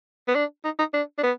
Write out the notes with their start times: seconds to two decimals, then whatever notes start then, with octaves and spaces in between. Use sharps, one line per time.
0.28 B3
0.35 D4
0.64 D#4
0.79 D#4
0.93 D4
1.18 D4
1.23 B3